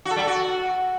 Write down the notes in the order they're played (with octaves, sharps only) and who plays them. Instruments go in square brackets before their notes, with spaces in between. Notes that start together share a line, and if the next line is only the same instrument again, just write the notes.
[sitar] F#4
A4
G3
A4
F#4